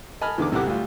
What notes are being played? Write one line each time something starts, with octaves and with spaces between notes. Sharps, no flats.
D#5 G#5 A5 B5 F6
E2 D3 D#3 D6
B1 C3 A3 E4 F#5 D6
D2 G3 F4